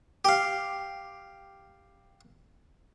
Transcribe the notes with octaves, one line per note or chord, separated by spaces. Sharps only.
G4 F5